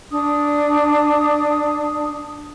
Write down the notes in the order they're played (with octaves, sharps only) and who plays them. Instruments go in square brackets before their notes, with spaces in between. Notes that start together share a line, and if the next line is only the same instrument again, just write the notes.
[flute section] D4 D#6